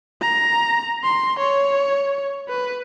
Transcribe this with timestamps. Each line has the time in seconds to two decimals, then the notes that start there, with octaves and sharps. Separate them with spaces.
0.21 A#5
1.03 C6
1.39 C#5
2.49 B4